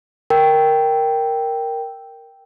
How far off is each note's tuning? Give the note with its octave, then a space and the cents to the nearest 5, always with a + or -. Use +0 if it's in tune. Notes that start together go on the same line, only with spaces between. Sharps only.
A#4 +0 G5 +0